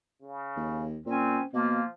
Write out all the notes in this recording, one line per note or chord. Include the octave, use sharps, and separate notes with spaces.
C#3
D#2
A#2 C4 C#4
B2 F3 A#3